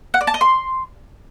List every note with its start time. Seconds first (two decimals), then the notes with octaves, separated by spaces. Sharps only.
0.14 F#5
0.21 D5
0.27 A5
0.34 D#5
0.41 C6